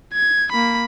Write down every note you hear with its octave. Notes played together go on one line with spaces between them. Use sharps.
G#6
A#3 B5